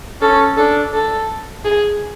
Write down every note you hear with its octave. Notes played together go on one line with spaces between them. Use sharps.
C#4 A4
D4 A4
A4
G#4